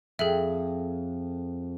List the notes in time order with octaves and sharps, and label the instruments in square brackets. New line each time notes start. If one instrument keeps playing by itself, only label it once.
[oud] F2 [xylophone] G#4 A4 E5